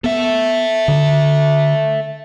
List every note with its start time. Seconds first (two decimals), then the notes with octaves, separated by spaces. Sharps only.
0.04 B3 A4 E5
0.88 D3